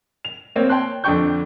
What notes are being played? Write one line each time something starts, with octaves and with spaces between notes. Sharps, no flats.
F7
A#3 C4 C#5
C#5 G5 A5 C6 F#6
F2 D3 D4 G5 C#6 G6